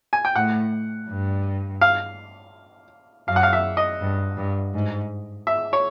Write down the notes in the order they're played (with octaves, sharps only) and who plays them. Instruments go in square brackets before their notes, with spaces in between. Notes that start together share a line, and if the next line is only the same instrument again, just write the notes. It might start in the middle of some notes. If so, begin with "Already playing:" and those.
[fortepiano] G#5
G5
[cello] A2 [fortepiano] F#5
[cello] G2
[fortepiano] F5
[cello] F#2 [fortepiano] F5
[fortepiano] F#5
F5
E5
D#5
[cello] G2
G2
G#2
[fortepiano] E5
C#5